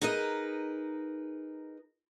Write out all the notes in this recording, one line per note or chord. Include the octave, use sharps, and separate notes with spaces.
D#4 G#4 A#4 B4 D#5